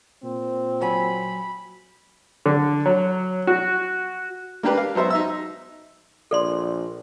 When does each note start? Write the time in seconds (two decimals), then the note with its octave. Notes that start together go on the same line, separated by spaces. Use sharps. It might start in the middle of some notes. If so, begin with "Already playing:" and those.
0.23 A#2 C4
0.81 F#3 G#5 B5
2.46 D3
2.86 F#3
3.47 F#4
4.63 A#3 D4 G4 B4
4.77 F5
4.95 F#3 B3 C5 E5
5.10 D#4 E5 E6
6.31 A#1 A4 D5 C6